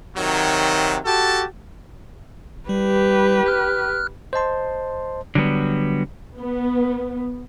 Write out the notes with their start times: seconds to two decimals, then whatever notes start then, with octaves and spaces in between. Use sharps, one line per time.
0.17 C3 D#3 F#3
1.05 F#4 G4 A4 A5
2.69 G3 G4 B4
3.46 F6 F#6
4.33 C5 D#5 A5 C6
5.35 D3 F#3 G3 B3
6.40 B3